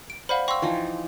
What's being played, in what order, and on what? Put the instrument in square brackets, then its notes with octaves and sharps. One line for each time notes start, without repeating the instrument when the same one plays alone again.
[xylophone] D7
[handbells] C5 D5 F#5 [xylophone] F5 B5
[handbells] F5 G5 C6 [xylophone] C#6 E6
[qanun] E3 F3 D#4